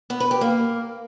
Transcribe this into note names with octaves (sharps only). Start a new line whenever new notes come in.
B3
B4
G4
A#3